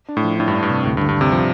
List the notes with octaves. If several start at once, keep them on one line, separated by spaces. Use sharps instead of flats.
D4
A2
F3
A2 D4
G2
D4
G2
C3
D2 A2
G2
D3
G2
D2 C3
F3 G3